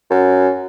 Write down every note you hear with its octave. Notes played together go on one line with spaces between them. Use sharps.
F#2